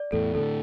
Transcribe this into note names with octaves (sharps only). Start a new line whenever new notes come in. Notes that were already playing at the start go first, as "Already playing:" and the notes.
Already playing: D5
E2 A2 A4
A2 D3 A4